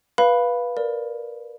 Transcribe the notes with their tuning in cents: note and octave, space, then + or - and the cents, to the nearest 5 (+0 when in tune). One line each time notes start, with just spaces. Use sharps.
B4 -15 F5 +0 B5 +0
A#4 +0 D5 +0